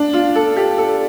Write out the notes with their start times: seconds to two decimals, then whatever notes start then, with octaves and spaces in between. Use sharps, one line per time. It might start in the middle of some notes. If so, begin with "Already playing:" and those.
Already playing: D4
0.13 F4
0.35 A4
0.57 G4
0.78 A4